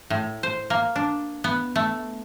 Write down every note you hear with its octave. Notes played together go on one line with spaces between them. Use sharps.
A2
C5
A#3
D4
B3
A3